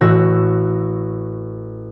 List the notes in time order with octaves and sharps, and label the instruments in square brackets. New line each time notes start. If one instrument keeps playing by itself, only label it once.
[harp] A1 F#4 E6 F#6 A#6 E7